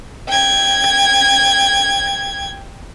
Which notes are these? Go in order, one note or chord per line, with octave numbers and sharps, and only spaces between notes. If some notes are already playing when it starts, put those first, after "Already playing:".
G5 G#6